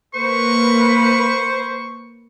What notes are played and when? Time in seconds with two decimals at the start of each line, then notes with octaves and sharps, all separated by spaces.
0.15 A#3 B4 C5 C#6